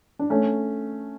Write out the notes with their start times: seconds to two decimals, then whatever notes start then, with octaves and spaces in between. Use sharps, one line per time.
0.19 D4
0.30 A3 C#4